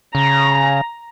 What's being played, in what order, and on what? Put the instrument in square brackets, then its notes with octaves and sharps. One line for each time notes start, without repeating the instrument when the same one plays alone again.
[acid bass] C#3 [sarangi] A#5